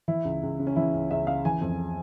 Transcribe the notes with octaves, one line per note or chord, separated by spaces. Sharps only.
E3 E4
C#2
C#2
C#3
C#4
E3 E4
C#2
C#2 E5
C#3 F5
E3 G#5
F2